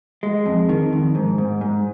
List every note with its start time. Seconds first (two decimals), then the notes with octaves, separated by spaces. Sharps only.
0.23 G#3
0.46 F2
0.69 D#3
0.93 F2
1.15 G#2
1.38 G#2
1.61 G#2